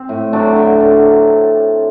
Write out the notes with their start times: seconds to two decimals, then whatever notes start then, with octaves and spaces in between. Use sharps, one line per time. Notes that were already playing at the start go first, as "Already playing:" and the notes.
Already playing: C4
0.09 A2
0.33 F#3 D4
0.56 D3
0.80 D3